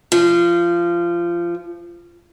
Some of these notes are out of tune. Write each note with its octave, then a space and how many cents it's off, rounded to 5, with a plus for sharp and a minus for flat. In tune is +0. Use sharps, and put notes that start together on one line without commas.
F3 -20